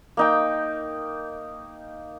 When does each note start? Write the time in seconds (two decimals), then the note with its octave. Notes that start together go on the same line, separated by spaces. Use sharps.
0.17 A#3 D#4 G5